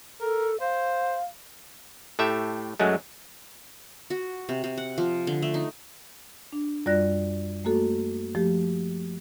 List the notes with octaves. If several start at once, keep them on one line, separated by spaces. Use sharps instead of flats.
A4 A#4
C5 F5
A2 A3 G4 E5
F#2 F#3 G#3 A3
F#4
C3
C3
F#5
F3
D3
A3
D#4
D4
F#2 G3 F4 D5 F#6 A#6
A3 A#3 F#4 A4
F3 A3 G4